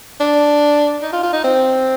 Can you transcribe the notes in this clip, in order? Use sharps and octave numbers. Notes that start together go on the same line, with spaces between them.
D4
D#4
F4
F4
D#4
C4